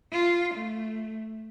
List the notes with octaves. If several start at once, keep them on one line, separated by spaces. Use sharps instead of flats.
F4
A3